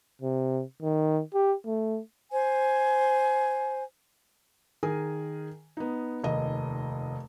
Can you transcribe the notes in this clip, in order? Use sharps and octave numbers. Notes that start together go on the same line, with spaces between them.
C3
D#3
G4
A3
C5 G#5
D#3 G#4 A#4 G#5
B3 D#4
F1 D#2 D#5